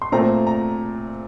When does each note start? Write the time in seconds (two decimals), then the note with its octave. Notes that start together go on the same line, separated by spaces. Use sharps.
0.02 C6
0.12 A#2 A3 C4 A#5
0.47 A#5